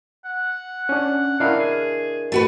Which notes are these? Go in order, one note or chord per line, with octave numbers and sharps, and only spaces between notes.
F#5
C#4 D4
D4 E4 A#4 F5
G#4
A3 F#4 B4